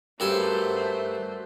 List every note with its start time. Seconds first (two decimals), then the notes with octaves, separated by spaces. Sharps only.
0.20 G2 A3 F#4 A4 A#4 C5 G#5